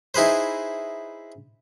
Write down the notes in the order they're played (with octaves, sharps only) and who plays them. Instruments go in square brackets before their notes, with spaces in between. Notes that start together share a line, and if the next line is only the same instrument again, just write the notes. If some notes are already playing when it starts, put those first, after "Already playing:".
[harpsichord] D#4 E4 G#4 B4 C5